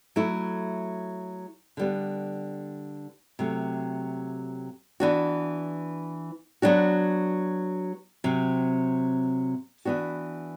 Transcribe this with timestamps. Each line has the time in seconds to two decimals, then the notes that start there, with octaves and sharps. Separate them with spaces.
0.16 F#3 A3 E4
1.77 D3 G3 B3
3.39 C3 F#3 A3
5.00 E3 B3 D4 F#4
6.62 F#3 B3 D4 F#4
8.24 C3 F#3 C4
9.85 E3 B3 D4 F#4